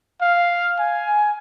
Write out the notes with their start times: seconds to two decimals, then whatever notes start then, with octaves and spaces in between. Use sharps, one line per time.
0.21 F5
0.79 G#5